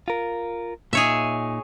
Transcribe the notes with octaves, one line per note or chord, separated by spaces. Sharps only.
F4 A#4
A#2 D#4 G#4 C#5 E5